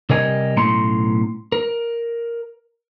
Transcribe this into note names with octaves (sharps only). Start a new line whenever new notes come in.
C3 G3 A#4 D#5 G#5
B1 A2 A3 C#4 A#5 C6
A#4